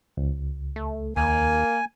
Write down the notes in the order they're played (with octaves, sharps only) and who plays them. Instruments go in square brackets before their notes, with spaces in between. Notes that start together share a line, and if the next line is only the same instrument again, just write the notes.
[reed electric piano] C#2
[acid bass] A3
[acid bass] D#2 [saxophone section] A#3 [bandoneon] G#5